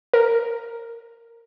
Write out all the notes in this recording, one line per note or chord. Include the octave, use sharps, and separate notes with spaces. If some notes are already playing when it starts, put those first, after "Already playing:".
A#4